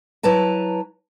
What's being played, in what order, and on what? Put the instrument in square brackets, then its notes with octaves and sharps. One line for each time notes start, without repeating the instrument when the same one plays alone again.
[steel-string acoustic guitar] F#3 E4 B4 A5 A#5